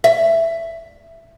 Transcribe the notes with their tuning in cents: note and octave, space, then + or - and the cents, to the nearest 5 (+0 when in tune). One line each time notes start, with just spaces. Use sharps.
E5 +10